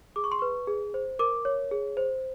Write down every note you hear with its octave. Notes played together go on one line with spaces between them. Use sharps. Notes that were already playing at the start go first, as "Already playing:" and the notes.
G#4 D6
C#6
C6
B4 C#6
G#4
C5
A#4 D6
C#5
G#4
C5